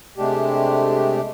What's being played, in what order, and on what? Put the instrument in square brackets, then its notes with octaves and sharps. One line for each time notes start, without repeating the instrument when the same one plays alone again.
[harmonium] C3 G#3 A3 D4 G4